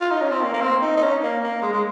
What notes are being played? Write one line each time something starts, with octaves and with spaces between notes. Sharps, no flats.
F4
D#4
C#4
C4
A#3
A#3
C4
D#4
D#4
C#4
A#3
A#3
G#3
G#3